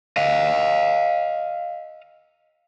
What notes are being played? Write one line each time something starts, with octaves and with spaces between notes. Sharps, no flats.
D#5 F5